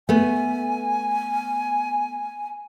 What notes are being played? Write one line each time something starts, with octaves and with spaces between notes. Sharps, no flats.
A3 B3 G#5